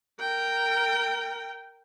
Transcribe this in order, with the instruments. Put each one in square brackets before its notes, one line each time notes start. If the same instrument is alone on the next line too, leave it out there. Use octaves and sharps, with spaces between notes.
[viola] A#4 G5